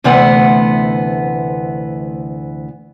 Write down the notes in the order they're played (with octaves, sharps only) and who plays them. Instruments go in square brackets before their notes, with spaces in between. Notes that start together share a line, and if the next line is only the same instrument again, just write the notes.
[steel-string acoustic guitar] D2 C3 E3 A3 B3 F#5